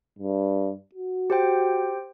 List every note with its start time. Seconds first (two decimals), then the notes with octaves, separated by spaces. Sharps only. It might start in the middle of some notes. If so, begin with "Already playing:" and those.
0.19 G2
0.95 F#4
1.30 G4 C5 G5